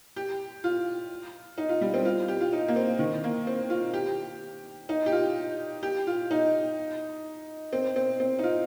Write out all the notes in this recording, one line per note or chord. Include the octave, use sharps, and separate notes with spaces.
G4
F4
D#4
F4
G3
C4
F4
G4
F4
D#4
A#3
C4
D#3
A#3
C4
F4
G4
D#4
G4
F4
G4
F4
D#4
C4
C4
C4
D#4
F4